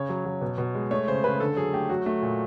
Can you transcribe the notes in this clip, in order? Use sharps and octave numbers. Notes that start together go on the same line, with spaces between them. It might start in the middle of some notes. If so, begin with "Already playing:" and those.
Already playing: C#3 C#5
F#3
F#3
B2
B2
G#3
A3 C#5
C#3 C5
C#3 B4
D3 A4
F#3 G#4
A3 G4
F#3 F#4
A3
A#2